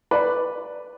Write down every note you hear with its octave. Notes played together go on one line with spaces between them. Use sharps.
B4 D5